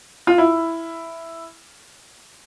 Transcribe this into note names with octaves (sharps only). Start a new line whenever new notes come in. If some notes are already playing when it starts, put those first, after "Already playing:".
F4
E4